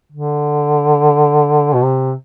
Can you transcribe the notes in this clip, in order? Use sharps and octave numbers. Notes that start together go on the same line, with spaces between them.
D3
B2
C3